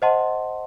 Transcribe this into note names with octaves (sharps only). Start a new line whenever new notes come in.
C5 D#5 F#5 A5 C6